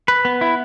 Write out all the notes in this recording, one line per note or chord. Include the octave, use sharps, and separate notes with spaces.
B4
B3
E4